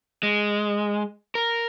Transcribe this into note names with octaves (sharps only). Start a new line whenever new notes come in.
G#3
A#4